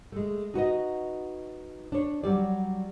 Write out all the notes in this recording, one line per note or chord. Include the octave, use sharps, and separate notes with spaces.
G#3 A3
D#4 F#4 B4 D#5
D4 C#5
F#3 G3 D5